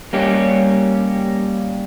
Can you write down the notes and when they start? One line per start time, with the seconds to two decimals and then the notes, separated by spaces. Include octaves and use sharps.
0.13 G3 A#3 C#4 G4